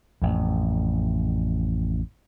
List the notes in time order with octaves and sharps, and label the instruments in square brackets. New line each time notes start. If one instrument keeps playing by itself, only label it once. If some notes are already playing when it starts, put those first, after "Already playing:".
[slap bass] A1 F2